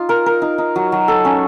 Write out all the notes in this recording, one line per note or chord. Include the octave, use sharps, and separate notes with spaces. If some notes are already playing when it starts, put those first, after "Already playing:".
Already playing: D#4 F4
A#4
A#4
D#4
D#4
F#3
F#3
A4
C#4